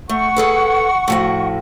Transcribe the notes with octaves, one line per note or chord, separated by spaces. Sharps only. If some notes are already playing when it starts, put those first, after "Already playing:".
A3 F#5 C#6
G#4 A4 B4
A2 F3 F#4